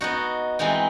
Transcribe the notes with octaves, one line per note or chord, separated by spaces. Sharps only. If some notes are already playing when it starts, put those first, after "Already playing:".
B3 D#4 F#4
E3 G#3 C4 D#4